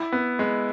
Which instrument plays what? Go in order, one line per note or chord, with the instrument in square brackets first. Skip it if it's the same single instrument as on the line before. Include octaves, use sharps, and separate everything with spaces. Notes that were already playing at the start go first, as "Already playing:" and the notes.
Already playing: [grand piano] E4
B3
G#3